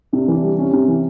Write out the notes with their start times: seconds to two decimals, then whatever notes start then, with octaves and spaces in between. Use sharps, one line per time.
0.13 C3 D4
0.28 E3
0.35 D4
0.43 G3
0.58 C3 C#4
0.73 C3
0.88 E3